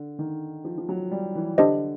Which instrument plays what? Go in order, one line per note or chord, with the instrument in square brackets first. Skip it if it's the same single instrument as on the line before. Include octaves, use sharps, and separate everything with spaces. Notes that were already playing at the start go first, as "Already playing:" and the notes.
Already playing: [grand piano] D3
D#3
F3
F3
F#3
G3
E3
[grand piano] D3 [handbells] D4 G4 C5 D#5